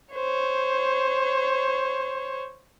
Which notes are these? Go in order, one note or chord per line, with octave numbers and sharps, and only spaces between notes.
C5 C#5